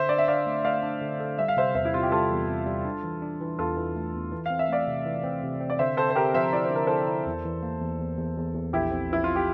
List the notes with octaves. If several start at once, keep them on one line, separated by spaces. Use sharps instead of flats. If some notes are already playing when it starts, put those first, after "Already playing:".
Already playing: D3 C5 E5
D4 D5
E5
D4 D5 F5
A3
A3 D5 F5
D4
D3
A4
G3 E5
F5
C3 C5 E5
E2 C5 E5
E4
C3 F4
G4
G3 F4 A4
E2
C3
G3
D4
E3
D4
E3
E2 F4 A4
E3
A3
E2
E3
C4 F5
E5
A3 D5 F5
C3
E3
C4
C3
C4
D5
D3 C5 E5
C4 A4 C5
C5
C4 G4 A#4
F3 C5 E5
E4 D5
C5
D3
A#4
E4 A4 C5
E4
E2
E3
A#3
E2
E2
E2
E2
E2
A#1 E4 G4
C4
F3 E4
F4
G4